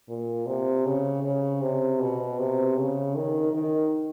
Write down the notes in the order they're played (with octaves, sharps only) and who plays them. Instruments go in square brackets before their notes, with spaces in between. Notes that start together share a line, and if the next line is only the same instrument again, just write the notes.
[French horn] A#2
C3
C#3
C#3
C3
B2
C3
C#3
D#3
D#3